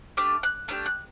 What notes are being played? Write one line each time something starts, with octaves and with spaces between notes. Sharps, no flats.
A3 D4 G4 F6
F#6
A3 D4 G4 F6
F#6